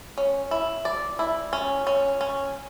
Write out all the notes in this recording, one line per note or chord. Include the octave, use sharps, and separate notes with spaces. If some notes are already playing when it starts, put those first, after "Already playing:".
C#4
E4
D5
E4
C#4
C#4
C#4